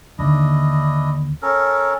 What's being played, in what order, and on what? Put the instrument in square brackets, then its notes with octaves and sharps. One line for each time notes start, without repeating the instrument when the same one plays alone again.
[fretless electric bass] D#2 D3 [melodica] D4 E4 D#5
[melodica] C#4 A4 A#4